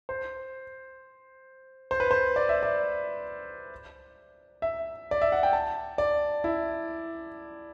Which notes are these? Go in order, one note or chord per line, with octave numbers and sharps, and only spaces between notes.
C5
C5
B4
C5
D5
E5
D5
E5
D5
E5
F#5
G5
A5
D5
E4